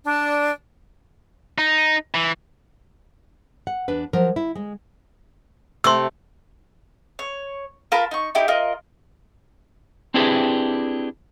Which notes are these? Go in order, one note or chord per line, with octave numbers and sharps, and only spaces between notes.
D4
D#4
E3
F#5
E2 D4 B4
F3 F#3 A#4
E4
G#3
C3 A3 C6 E6
C#5
F4 A#4 A5 B5
D#4 C#6
D#4 E4 G4
F4 A#4 D#5
C4 D4 E4 G4 G#4 B4